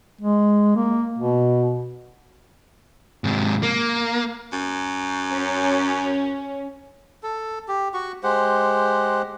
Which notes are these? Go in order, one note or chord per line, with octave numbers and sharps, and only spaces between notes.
G#3
A#3
B2
G#2 C3
A#3
F#2
C#4
A4
G4
F#4 C#6
G#3 G4 C5 F#5